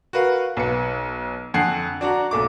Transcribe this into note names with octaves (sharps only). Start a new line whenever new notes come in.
F#4 A#4 B4 F5
B1 B4 C#7
F2 D3 F#5 G#5 C7
D4 F#4 D5 A#5
B1 A3 D6